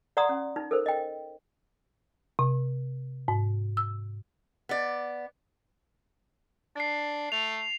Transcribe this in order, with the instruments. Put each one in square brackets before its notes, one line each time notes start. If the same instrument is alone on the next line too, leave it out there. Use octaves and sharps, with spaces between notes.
[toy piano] D5 F#5 A#5 C6 D#6
C#4
D#4
A4 A#4 C5
D#5 G5
[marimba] C3
G#2
E6
[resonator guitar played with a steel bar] B3 D5
[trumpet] D4 [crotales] A6 C7
[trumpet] A3 [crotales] F7